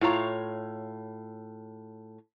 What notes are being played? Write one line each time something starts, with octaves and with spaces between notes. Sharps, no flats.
A2 F4 C#5 A#5